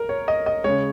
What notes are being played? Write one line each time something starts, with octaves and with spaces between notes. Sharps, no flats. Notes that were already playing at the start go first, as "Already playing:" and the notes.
Already playing: A#4
C#5
D#5
D#5
C#3 G#3 C#5